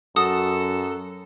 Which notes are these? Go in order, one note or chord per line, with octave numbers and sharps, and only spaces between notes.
F#2 F#4 A4 A5 D#6